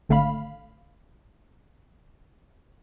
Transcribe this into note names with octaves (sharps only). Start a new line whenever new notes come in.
G#1 D3 A3 F5 B5